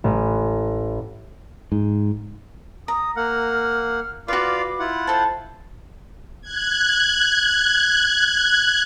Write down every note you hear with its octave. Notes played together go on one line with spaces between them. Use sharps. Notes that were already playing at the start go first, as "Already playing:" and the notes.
A1
G#2
A#5 D#6
A#3 F#5 F6
F4 F#4 B4 D5 F5 D6
E4 F4 F#5
A4 C5 A5
F#6 G#6